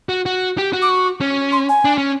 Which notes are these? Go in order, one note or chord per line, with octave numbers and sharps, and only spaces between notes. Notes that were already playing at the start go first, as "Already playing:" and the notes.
F#4
F#4
G4
F#4
D6
C#6
C#4
C6
G#5
D4
C#4